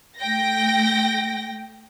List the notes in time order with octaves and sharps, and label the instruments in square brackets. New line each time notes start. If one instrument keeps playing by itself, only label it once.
[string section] A3 G5 A#6